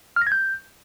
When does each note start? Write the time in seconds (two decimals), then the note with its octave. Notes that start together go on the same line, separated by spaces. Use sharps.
0.16 F6
0.22 A#6
0.27 G#6
0.32 G6